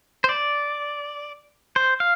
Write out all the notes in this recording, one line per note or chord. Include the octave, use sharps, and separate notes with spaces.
C5
D5
C5
F5